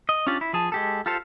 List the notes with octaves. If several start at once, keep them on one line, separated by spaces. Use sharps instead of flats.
D#5
C#4 D4 F4 G4 D5
E4
F3 G#4 A5
G#3 G4 A4
F4 G4 A4 C5 F5